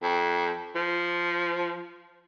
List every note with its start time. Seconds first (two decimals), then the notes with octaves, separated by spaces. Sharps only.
0.03 F2
0.76 F3